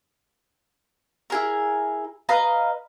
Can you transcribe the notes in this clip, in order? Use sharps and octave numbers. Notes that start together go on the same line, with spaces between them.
E4 G#4 A#4
B4 D#5 F5 A#5